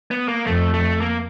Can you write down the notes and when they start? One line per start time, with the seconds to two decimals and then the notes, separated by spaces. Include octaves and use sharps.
0.11 B3
0.28 A#3
0.47 F2 A3
0.74 A3
1.01 A#3